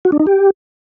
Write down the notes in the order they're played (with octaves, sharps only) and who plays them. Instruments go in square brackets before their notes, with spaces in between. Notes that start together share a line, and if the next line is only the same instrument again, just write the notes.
[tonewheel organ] F#4
D4
D#4
G4